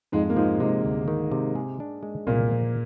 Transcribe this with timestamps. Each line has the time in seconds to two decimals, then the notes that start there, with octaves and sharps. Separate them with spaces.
0.12 F2 G#2 G#3
0.30 A#3
0.36 G#2 F3 G#3
0.60 G#2 C3 G#3
0.85 D2
1.08 D#3
1.32 C3
1.55 G#4
1.80 D4
2.03 G#3
2.27 C2 A#2 A#3
2.51 F3